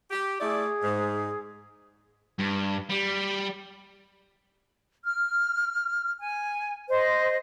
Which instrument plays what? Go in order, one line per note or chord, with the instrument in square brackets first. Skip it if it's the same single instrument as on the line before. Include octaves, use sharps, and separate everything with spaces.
[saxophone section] G4
[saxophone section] A3 E4 D5 [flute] G#4
[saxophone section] G#2
[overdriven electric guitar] G2
G3
[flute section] F6
G#5
C5 D#5